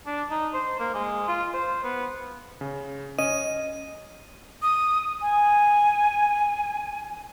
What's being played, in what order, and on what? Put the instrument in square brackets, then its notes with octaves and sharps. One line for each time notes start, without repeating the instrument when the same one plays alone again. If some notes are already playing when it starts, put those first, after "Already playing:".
[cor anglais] D4
D#4
C5
A#3
G#3
F4
C5
B3
[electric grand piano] C#3
[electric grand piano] C#4 [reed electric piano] D#5 [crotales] D#7
[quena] D#6
G#5